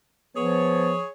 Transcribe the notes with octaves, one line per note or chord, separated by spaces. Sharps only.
F3 B3 G#4 C#5